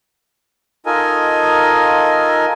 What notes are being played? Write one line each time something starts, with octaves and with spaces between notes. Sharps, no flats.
D#4 F4 A4 A#4 D#5 G#5